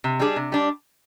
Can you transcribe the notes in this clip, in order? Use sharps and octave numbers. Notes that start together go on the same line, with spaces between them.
C3
G3 D4 G#4
C3
G3 D4